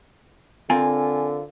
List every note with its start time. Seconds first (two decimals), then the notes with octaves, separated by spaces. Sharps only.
0.70 D3 C4 F4 A#4 G#5